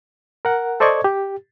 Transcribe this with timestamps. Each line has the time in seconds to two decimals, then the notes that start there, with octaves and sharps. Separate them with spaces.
0.45 A#4 F#5
0.80 A4 C5 D5 D#5 C#6 G#6
1.04 G4